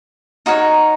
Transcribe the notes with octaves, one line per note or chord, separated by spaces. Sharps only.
D#4 F#4 A#4 C#5